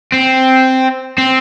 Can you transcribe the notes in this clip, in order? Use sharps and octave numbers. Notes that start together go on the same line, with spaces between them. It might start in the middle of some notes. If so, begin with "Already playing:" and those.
C4
C4